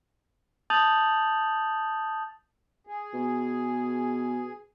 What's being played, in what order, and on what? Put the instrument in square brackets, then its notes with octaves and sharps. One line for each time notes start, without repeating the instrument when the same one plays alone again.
[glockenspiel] A5 D#6 G6 A6 F7 F#7
[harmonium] G#4
[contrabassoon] B2